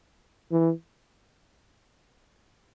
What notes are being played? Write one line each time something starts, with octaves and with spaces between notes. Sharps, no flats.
E3